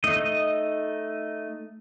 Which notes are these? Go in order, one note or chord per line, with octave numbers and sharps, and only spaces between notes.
A3 D#4 D#5